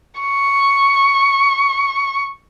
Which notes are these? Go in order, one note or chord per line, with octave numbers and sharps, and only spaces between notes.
C#6